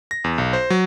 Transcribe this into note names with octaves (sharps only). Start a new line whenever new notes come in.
A#6
E2
B1
C5
F#3